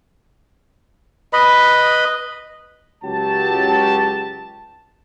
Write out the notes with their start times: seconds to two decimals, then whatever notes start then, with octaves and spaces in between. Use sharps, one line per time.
1.33 B4 D#5 B5
3.04 C#2 F#3 G4 A5